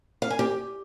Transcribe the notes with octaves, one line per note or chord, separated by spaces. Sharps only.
F5
G#5
G4